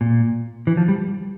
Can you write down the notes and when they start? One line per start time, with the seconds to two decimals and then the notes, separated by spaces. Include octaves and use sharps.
0.01 A#2
0.67 E3
0.77 F3
0.88 G3